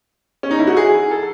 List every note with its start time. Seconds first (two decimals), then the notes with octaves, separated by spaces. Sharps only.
0.43 C#4
0.51 D#4
0.59 E4
0.67 F#4
0.77 G#4
1.11 A4